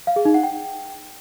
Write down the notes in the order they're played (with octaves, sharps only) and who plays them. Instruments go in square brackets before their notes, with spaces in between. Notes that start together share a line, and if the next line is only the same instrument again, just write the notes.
[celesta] F5
G#4
D#4
F#5
G5